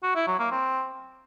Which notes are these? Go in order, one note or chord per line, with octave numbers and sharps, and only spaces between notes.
F#4
E4
F#3
A#3
C4